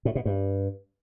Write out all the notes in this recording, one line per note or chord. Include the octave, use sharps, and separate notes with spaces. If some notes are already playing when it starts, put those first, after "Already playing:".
A2
B2
G2